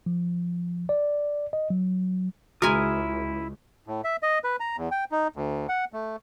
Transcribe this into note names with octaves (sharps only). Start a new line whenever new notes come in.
F3
D5
D#5
F#3
C#2 E4 F#4 G#4 A#4 G#5 C6 D#6
A2
E5
D#5
B4
A#5
E2
G5
D#4
D2
F#5
A3